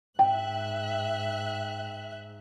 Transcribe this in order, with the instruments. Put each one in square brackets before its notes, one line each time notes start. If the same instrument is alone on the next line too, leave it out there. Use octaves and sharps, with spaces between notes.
[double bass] G#2 [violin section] E5 F#6 [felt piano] G5